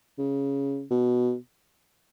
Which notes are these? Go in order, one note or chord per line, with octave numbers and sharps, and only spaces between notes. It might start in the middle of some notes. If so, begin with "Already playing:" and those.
C#3
B2